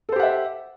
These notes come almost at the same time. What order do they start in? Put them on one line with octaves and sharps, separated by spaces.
A4 C5 G4 F#5 E5